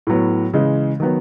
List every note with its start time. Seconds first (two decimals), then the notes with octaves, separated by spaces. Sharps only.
0.07 A2 F#3 B3
0.53 C#3 E3 G#3
1.00 D#3 F#3 B3